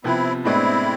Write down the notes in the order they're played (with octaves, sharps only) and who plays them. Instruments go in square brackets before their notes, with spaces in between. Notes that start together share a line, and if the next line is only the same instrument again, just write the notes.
[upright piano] C3 F3 B3 [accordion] C4 E4
[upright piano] A2 G#3 B3 D4 [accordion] C4 E4